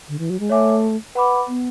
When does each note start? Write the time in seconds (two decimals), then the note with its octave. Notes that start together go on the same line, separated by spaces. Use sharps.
0.08 D3
0.19 E3
0.30 F#3
0.40 G#3
0.49 A3 C#5 E5 G#5 D6
1.15 B4 F#5 B5 D6
1.47 B3